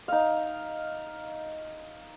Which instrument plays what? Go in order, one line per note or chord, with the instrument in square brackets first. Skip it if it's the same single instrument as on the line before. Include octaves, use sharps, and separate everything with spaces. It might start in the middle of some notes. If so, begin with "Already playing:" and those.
[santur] D#4 F5